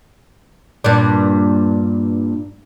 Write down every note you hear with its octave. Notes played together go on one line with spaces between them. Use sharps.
G2 A#2 D4